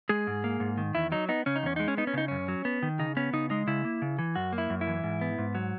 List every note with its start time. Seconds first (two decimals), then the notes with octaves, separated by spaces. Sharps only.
0.09 G#3 G#4
0.27 G#2
0.44 A#3
0.60 G#2
0.78 D#3
0.95 E2 E4
1.12 F#3 D#4
1.29 B3 D#4
1.46 C#3 C#4
1.56 D#4
1.63 E2 C#4
1.76 G#3 D#4
1.88 C#4
1.97 B3 D#4
2.07 C#4
2.14 C#3 D#4
2.28 F#2 C#4
2.48 F#3
2.65 B3
2.83 D#3
2.99 C#3 D#4
3.17 B3 C#4
3.33 C#3 D#4
3.50 G#3 D#4
3.67 C#3 E4
3.85 A#3
4.02 C#3
4.19 E3
4.35 F#2 F#4
4.53 A#3
4.58 E4
4.70 F#2
4.81 E4
4.87 E3
5.03 G#2
5.21 B3
5.38 G#2
5.55 F#3